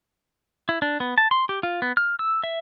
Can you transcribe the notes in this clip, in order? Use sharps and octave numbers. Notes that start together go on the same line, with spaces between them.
E4
D4
B3
A5
C6
G4
F4
B3
F6
E6
E5